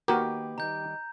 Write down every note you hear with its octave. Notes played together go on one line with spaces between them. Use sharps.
D#3 A#3 F#4 G4 A#4 B4
D#3 G3 A#5 G6